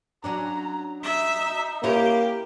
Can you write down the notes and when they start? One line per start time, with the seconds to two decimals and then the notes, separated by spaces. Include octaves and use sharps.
0.24 F#3 C#4 D4 A#5
1.03 D#4 E5
1.83 A#3 C#4 E4 G4 C#5